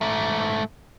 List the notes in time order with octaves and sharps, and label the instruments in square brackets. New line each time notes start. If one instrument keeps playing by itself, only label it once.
[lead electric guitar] G#2 A3